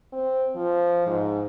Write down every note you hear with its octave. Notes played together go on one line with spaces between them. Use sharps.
C4
F3
G#2